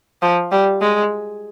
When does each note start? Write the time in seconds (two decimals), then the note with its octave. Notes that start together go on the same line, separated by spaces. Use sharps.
0.22 F3
0.52 G3
0.81 G#3